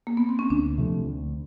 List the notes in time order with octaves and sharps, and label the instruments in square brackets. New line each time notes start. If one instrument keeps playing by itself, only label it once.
[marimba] A#3
B3
C4
C#4
[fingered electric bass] D2 [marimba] D4
[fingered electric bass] C3 F3 A3
D2